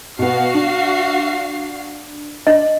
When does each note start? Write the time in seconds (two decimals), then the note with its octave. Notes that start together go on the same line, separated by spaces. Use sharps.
0.19 B2 B3 F#4 F5 C7
0.54 D4
2.47 D4 D#5